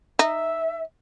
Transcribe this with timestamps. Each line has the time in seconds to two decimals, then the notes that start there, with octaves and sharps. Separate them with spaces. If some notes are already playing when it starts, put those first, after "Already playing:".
0.19 D#4 E5